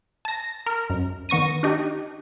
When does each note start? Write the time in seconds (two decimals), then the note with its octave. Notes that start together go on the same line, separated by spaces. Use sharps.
0.25 A5 A#6
0.66 A#4
0.90 F#2
1.29 D#3 B3 C#6 A#6 D#7
1.63 D4 D#4 G4